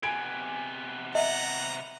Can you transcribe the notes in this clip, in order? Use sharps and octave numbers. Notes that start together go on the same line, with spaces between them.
C3 B3 G#5 G#6 D7
D#5 E5 F#5 A#5